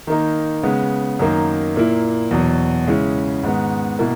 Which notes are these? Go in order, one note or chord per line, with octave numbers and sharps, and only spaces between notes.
D#3 A#3 D#4
C#3 G#3 B3
F#2 D#3 A#3 D#4
A#2 A#3 E4
E2 B2 F#3
C#3 G#3 C#4 E4
G#2 D#3 G#3 B3
B2 A#3 E4